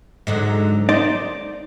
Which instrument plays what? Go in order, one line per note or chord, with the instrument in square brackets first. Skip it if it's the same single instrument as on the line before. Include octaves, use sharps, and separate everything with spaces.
[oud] G#2 D3 F#3
[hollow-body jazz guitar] D#4 D5 [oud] C5